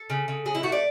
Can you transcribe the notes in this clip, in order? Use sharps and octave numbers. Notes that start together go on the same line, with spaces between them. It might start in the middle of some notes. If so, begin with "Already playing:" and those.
Already playing: A4
C#3
C#3
F#3 G#4
E4
A3 F#4
D5